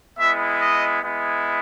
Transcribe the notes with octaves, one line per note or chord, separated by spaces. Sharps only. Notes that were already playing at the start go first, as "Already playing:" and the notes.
G#3 B3 E4 E5
D#5
G#3 B3 E4